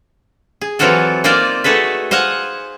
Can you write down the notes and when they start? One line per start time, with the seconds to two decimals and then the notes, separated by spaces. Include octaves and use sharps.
0.61 G#4
0.79 E3 F#3 C4 F4 F#4 A4
1.24 A#3 D#4 F4 C5 D5 F5
1.64 A3 F#4 G#4 A4 B4
2.11 C5 D#5 F5 F#5 G#5